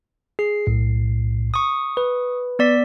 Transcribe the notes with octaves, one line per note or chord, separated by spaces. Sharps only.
G#4 C7
B1 A2
C#6 D#6
B4
B3 D5 B6